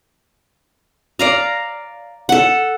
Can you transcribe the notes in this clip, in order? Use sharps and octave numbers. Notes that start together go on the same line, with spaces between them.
D5 F5 A#5
A4 F#5